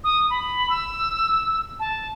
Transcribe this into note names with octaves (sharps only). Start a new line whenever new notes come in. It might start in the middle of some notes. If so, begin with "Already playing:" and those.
D#6
B5
E6
A5